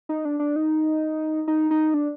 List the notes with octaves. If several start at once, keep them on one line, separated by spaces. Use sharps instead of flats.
D#4
D4
D4
D#4
D#4
D#4
D4